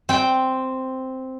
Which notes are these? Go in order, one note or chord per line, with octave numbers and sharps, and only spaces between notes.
C4 G5